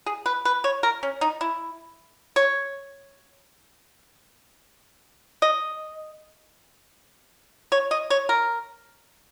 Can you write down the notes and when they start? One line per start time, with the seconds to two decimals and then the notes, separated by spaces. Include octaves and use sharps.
0.06 G#4
0.26 B4
0.45 B4
0.64 C#5
0.83 A#4
1.03 C#4
1.21 D#4
1.41 E4
2.36 C#5
5.42 D#5
7.72 C#5
7.91 D#5
8.10 C#5
8.29 A#4